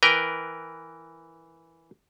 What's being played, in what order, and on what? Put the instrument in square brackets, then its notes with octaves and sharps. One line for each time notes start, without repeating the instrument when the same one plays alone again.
[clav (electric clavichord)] E3 A#4 B4 G5